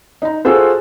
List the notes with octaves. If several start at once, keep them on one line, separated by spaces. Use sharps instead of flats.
D#4 A#5
F4 F#4 G#4 A4 C5